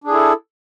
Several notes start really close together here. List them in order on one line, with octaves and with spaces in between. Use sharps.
D4 G#4 E4 A4